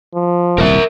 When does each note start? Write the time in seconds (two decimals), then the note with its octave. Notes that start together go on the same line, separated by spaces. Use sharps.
0.14 F3
0.58 D#1 C2 A#4 E5